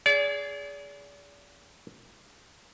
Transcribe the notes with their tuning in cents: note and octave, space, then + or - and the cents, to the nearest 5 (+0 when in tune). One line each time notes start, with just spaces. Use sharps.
G#4 +0 D5 -40